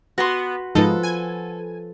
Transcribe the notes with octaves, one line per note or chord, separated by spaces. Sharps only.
B3 F#4 C6
G#2 F3 G#3 D#4 F4 A4 B4
G#5